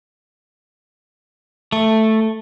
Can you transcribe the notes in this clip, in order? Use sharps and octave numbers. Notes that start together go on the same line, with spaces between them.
A3